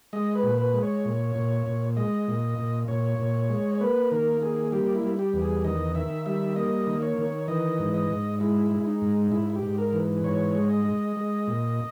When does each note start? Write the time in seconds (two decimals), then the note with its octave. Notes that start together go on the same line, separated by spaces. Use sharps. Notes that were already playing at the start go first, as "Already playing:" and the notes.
0.13 G#3 D#5
0.35 B4
0.43 A#2
0.58 B4
0.74 G#3
0.83 C#5
1.05 A#2
1.36 A#2
1.67 A#2
1.97 G#3 D#5
2.28 A#2
2.59 A#2
2.88 A#2 C#5
3.19 A#2
3.49 G#3
3.75 C#5
3.81 A#3 B4
4.11 D#3 A#4
4.42 A#3 G#4
4.72 G3 G4
4.95 E4
5.03 G3
5.19 G4
5.34 E2
5.42 G#4
5.64 D#3 D#5
5.95 D#3 E5
6.26 G3 E5
6.56 A#3 D#5
6.87 D#3
7.02 C#5
7.18 D#3
7.48 E3 D#5
7.79 G#2
7.94 D#5
8.10 G#2
8.40 G#3 E4
8.71 G#3
8.80 E4
8.87 D#4
9.02 G#2
9.32 G#2 E4
9.50 E4
9.55 G4
9.63 G#2
9.78 A#4
9.93 E3
10.24 G#2 C#5
10.55 G#3
10.70 D#5
10.85 G#3
11.17 G#3
11.47 A#2